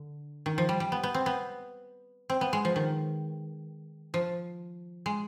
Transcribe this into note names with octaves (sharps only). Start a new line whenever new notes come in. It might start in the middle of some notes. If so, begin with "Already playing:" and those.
Already playing: D3
D#3
F3
G3
G3
B3
B3
C4
B3
C4
B3
G#3
F3
D#3
F3
G#3